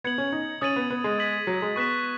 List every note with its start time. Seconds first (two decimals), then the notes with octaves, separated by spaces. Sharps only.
0.04 B3 G#6 C#7 F#7
0.18 C#4
0.32 D#4
0.61 C#4 D#6 A6 D#7 F#7
0.76 B3
0.90 B3
1.04 G#3
1.19 D#6 G#6 B6 F#7
1.47 F#3
1.62 G#3
1.76 B3 C#6 F#6 B6 E7